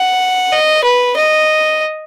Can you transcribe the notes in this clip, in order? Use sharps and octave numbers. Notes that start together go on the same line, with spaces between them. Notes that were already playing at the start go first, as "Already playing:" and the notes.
Already playing: F#5
D#5
B4
D#5